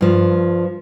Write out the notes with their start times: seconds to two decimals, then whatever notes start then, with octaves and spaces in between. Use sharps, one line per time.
0.01 G2 F3